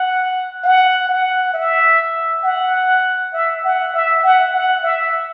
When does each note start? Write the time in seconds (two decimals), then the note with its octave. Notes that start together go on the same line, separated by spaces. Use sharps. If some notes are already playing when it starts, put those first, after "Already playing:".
Already playing: F#5
0.64 F#5
1.09 F#5
1.54 E5
2.44 F#5
3.34 E5
3.64 F#5
3.94 E5
4.23 F#5
4.54 F#5
4.84 E5